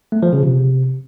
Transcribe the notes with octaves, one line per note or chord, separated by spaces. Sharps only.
A3
F3
C#3
C3